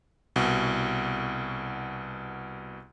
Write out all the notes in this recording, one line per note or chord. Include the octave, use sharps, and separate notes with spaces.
C2 B2